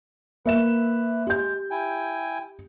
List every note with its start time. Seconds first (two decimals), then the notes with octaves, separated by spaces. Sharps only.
0.46 A#3 B4 E5 E7
1.27 G#3 G4 G6
1.71 E4 G5 G#5